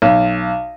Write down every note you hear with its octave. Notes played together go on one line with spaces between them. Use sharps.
B1